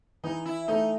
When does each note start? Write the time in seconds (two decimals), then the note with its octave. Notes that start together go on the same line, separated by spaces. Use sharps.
0.24 E3 D#4
0.46 E4
0.68 A3 D#4